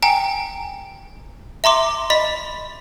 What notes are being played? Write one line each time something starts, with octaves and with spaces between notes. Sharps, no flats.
G5 G#5 A#5
E5 A#5 C6 D6
D#5 B5 B6